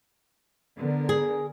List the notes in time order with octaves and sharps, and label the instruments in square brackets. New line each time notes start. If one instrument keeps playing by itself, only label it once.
[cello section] D3 B3 A#4
[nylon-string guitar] G#4